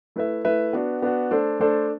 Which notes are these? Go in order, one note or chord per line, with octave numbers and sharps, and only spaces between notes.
A3 E4 B4 E5
A3 E4 B4 E5
B3 D4 F#4
B3 D4 F#4
A3 D4 A4 C5
A3 D4 A4 C5